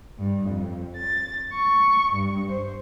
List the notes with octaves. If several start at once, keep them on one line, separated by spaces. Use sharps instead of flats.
G2
F2
A6
C#6
G2
C5